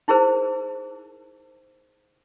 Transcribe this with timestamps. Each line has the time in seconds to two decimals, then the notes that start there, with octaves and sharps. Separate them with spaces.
0.08 D#4 E4 G#4 A#4 C5